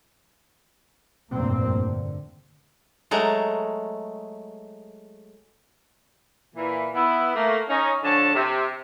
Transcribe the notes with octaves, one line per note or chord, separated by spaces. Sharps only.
F1 A#1 G2 A#2 A#3 C4
D3
F#3 G#3 A3 A#5
A#2 E3
B3 E4
A3 A#3
C#4 D#4
D3 F3 C#5 A5
C3